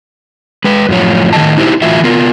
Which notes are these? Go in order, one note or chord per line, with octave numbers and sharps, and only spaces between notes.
G#3 B4
F#2 A2 F3 C#5
A2 D#3 B3 F#4 D#5 A5
D#4 E4 G4 C5
A2 E3 F4 F#4 E5
B3 F4 A#4